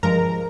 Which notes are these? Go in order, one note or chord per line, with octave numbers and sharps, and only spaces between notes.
G2 F3 G#3 A#4 A#5